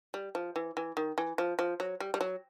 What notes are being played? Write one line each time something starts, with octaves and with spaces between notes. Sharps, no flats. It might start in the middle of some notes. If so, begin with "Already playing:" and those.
G3
F3
E3
E3
D#3
E3
F3
F3
F#3
G3
G3
F#3